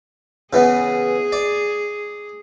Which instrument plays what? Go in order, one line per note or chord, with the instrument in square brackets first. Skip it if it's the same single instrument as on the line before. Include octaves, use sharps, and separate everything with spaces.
[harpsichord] C#3 E3 B3 [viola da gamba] G#4
[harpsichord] D5